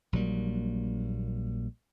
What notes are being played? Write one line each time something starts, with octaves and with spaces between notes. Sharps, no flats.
A#1 F#3 G3 A#3